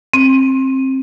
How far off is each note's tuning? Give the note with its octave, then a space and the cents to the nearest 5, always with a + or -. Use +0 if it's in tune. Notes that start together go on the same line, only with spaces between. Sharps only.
C4 +25